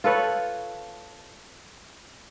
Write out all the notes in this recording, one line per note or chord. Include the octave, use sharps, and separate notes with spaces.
F4 A4 B4 C#5